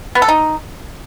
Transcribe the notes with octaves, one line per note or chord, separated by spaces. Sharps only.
B3
A4
D#4